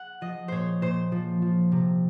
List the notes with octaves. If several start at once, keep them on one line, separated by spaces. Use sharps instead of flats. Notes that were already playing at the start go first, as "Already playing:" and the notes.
Already playing: F#5
F3 D#5
A#2 C5 C#5
A#2 C5
F3
F3
C3